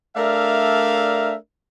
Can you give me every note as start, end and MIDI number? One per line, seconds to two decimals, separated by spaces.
0.16 1.34 57
0.16 1.34 62
0.16 1.34 70
0.16 1.34 74
0.16 1.34 76
0.16 1.34 77